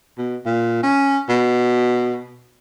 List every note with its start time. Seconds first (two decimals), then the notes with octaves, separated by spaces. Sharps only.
0.18 B2
0.46 A#2
0.83 C#4
1.30 B2